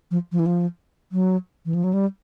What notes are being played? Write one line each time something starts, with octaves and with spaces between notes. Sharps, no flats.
F3
F3
E3
F3
F#3
E3
F3
F#3
G3